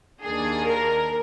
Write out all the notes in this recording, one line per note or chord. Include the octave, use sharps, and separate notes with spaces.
D#2 D#3 A#3 D4 G#4
A#4